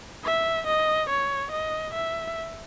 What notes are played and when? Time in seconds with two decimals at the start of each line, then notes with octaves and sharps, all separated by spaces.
0.25 E5
0.67 D#5
1.10 C#5
1.52 D#5
1.94 E5